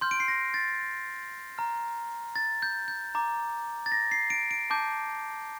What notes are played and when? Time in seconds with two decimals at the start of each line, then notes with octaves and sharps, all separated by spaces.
0.01 C6 F6 G6
0.11 D7
0.20 C7
0.28 A#6
0.54 A6
1.58 A#5 F6
2.36 A6
2.62 G6
2.88 G6
3.14 A#5 D6 G6
3.86 A6
3.92 A#6
4.11 C7
4.30 D7
4.51 D7
4.70 A5 D6 G6